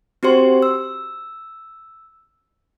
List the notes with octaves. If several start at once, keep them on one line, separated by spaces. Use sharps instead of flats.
C4 F#4 G4 C5 C6
E6